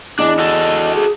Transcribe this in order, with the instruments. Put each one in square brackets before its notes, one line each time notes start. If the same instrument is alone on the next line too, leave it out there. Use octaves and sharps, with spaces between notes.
[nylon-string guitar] E2 G#4 [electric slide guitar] D4 [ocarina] D#5
[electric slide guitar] F#4 A4
[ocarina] G#4